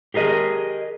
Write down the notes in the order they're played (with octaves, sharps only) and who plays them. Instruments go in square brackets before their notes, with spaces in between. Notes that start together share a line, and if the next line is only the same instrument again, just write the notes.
[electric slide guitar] G4 G#4 A#4 D#5